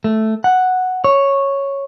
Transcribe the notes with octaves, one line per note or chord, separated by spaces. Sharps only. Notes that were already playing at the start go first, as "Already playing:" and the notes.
A3
F#5
C#5